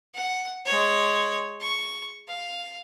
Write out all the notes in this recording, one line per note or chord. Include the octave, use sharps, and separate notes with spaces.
F#5
G#3 C#5
C#6
F5